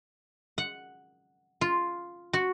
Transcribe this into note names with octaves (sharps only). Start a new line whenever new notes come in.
F#5
F4
F#4